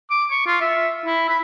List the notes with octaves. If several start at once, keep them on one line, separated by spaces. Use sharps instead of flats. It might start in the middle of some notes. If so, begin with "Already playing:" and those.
D6
C#6
F4
E5
E4
B5